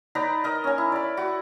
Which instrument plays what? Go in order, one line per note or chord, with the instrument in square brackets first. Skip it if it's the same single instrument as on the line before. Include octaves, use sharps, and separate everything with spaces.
[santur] D#4 B4 D5 A#5
A#4 D#5
C#4 G#5
E4
D5 B5
F#4